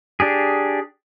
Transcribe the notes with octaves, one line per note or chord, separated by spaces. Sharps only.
D4 G4 G#4